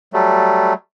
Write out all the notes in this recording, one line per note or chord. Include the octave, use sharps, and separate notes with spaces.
F#3 G3 A3